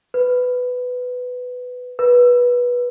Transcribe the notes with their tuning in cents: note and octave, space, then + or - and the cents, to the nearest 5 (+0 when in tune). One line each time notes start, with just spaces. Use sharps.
B4 +10
B4 -20